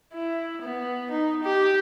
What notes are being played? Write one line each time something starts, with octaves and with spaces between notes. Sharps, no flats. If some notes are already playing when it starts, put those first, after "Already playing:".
E4
B3
D#4
G4